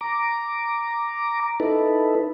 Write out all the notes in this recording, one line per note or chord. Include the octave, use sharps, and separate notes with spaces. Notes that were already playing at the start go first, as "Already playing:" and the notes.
A#5 D6
D#4 E4 A4 B4